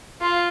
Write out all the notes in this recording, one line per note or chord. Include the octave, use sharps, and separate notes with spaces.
F4